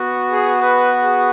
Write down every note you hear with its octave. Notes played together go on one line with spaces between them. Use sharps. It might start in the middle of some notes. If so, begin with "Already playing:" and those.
Already playing: B3 F#4
G#4
B4
G#4